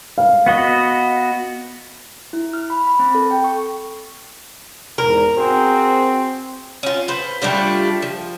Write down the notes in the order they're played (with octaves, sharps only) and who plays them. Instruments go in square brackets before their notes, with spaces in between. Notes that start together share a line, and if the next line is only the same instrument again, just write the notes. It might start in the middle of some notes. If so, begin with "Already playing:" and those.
[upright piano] F5
[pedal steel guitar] B3 F#4 D#5
[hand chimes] E4
F6
B5
B5
C4
A4
G5
C#6
[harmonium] E2 G#2 [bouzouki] A#4
[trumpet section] C4 [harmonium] F#4 G#4 C5
[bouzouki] C#4 F4
B4 C5
G3 A3 D4 F4
F3